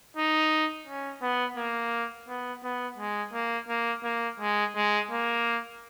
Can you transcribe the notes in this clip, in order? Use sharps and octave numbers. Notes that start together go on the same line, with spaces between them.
D#4
C#4
B3
A#3
B3
B3
G#3
A#3
A#3
A#3
G#3
G#3
A#3